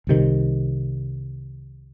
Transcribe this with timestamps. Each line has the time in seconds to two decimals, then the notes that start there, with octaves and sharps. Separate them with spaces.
0.07 C2 C3 D#3